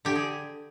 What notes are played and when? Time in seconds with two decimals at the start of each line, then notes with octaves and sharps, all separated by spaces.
0.05 D3 G4
0.16 G#4